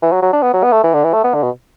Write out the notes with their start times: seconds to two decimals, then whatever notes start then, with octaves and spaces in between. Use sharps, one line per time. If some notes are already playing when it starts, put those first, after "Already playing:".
0.02 E3
0.12 F#3
0.22 F#3
0.33 D4
0.42 B3
0.53 F#3
0.63 B3
0.72 A3
0.84 E3
0.93 D3
1.04 E3
1.13 A3
1.24 B3
1.34 D3
1.43 B2